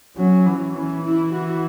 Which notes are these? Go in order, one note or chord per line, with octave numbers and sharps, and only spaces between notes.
F#3 C#4
E3
E3 C#4
E4
F#4